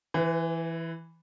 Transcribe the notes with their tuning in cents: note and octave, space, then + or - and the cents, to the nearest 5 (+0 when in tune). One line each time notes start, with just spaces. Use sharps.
E3 +0 B4 +45